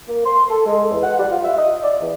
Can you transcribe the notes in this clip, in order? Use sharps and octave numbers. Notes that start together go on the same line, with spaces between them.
A#3
C6
A4
G#3
E2
F#5
G3
F4
E5
D#5
D5
E2